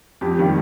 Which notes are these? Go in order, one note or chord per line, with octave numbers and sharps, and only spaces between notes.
F2 G4
D#3 G3 A#3